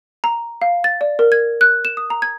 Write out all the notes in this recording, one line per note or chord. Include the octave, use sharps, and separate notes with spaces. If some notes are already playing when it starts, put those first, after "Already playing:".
A#5
F5
A6
D5
A#4
G#6
F#6
E7
D#6
A#5
G#6